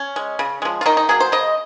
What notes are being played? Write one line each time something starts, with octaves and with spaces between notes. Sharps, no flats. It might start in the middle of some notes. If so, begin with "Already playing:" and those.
Already playing: C#4
G#3
C#3
F3 G#3
F4
D#3 D#4
D#4
F#3 A#3 G#4
C5
C#3 D#5